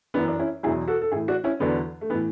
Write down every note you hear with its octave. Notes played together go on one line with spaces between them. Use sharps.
F#2 E3 B3 D4
D4
C#4 E4
E2 B2 F#3 E4 G#4
F#4 A4
A4
A2 E3 E4 G#4
D4 F#4
C#4 E4
E2 D3 F#3 B3 D4
A3
A2 E3 B3